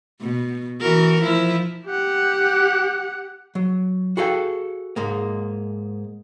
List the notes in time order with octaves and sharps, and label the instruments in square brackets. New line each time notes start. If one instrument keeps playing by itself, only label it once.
[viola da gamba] B2
E3 F#4 A#4
F3 E4
[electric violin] G4 F#5
[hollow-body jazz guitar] F#3
F#4 G#4 A4 F5 G5
G#2 G#3 A#3